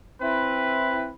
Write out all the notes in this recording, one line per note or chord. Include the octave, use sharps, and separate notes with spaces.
C4 E4 B4